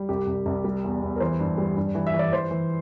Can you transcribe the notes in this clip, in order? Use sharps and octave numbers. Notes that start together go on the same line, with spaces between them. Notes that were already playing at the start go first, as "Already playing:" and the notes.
Already playing: G3
C2 G4
C2
C2
G3
E2
E2
A#4
E3 C5
G2
G3
G2
E3
E5
E3
D5
E3 C5
E3